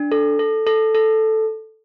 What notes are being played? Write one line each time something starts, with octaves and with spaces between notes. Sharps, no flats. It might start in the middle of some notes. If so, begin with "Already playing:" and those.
Already playing: D4
A4
A4
A4
A4